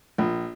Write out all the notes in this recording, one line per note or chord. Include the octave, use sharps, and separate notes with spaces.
A#1